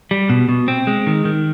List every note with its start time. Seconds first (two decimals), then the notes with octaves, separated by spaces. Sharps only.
0.11 G3
0.30 B2
0.49 B2
0.68 C4
0.87 G#3
1.07 D#3
1.25 D#3